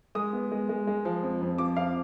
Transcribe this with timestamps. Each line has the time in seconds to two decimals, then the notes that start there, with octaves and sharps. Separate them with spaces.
0.15 G#3 D#6
0.33 B3
0.52 G#3
0.69 G#3
0.87 G#3
1.05 F3
1.23 F2
1.41 F2
1.58 F3 D6
1.76 F2 F5